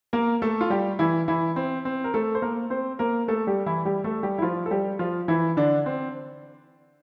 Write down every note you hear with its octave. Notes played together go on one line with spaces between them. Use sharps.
A#3 A#4
A3 A4
F4
G3 G4
E3 E4
E3 E4
C4
C4
A#4
A3 A4
C5
A#3 A#4
C4 C5
A#3 A#4
A3 A4
G3 G4
E3 E4
G3 G4
A3 A4
G3 G4
E4
F3 F4
A4
G3 G4
F3 F4
E3 E4
D3 D4
C4